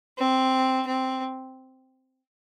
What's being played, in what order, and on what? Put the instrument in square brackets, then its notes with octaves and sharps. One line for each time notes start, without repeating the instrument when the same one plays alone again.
[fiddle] C4
C4